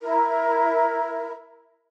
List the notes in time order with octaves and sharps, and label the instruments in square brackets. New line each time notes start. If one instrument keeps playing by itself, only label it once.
[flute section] E4 A#4